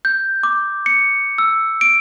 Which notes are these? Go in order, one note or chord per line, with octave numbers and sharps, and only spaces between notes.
G6
D6
C#7
E6
D7